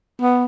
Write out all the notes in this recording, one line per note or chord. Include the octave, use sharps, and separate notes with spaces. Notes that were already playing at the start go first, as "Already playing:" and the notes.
B3